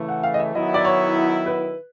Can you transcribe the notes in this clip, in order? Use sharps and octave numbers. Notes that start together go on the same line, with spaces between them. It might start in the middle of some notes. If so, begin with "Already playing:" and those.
Already playing: C#3 E3 A3
F#5
F5
D#5
E5
D#3 F#3 B3 E4 D#5
D5
C#5
B4